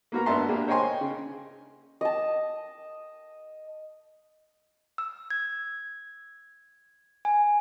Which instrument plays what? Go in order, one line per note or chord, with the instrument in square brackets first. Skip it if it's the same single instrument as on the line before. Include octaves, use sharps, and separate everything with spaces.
[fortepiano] A#3 B3 F#4 A#4 A#5
G#1 B3 D4 E5 A5 C6
G#3 A#3 D4 G4
C5 C#5 D#5 G5 G#5 C6
C#3
[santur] D#5 A5
[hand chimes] E6
G#6
G#5